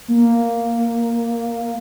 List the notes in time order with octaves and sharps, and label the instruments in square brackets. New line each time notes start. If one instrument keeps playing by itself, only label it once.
[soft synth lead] A#3